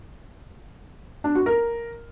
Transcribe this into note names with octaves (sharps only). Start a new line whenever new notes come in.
D4
F#4
A#4